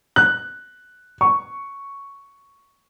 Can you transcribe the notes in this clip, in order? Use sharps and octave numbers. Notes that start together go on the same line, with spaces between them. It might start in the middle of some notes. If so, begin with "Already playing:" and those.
F#6
C#6